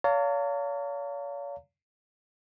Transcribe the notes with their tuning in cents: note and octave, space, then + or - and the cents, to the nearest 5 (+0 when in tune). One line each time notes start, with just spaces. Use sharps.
C#5 +40 F5 +0 A#5 -45